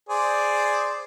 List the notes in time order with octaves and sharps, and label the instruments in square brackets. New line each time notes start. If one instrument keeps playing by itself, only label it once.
[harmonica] G#4 C5 D5